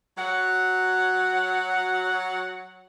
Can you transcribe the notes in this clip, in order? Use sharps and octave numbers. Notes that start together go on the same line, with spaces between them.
F#3 F#5